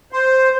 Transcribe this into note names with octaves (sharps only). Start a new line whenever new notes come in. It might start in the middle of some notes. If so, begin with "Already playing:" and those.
C5